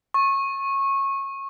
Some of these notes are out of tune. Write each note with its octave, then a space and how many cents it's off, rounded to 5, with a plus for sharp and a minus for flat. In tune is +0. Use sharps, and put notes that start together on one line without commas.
C#6 -20